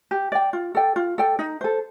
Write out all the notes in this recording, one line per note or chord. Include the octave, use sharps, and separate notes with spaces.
G4
D5 G5
F4
A4 D5 G5
F4
A4 D5 G5
D#4
A4 C5